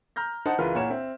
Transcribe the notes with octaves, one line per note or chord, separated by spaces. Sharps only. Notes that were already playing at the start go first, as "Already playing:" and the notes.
A#5 F6 G6 A#6
D#4 C5 F#5 A5
C#2 E3 F4 A#4 B4
A#2 E4 C#5 F#5 A#5 E7
C4 E5